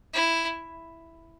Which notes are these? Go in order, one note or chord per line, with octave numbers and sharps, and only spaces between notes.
E4